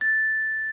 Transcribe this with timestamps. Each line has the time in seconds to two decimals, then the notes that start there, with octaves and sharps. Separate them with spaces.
0.01 A6